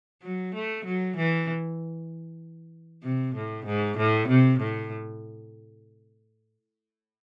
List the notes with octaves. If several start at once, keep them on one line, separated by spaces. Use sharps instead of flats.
F#3
A3
F#3
E3
C3
A2
G#2
A2
C3
A2